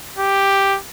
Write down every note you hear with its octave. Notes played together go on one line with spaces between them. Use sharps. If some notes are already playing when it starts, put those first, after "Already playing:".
G4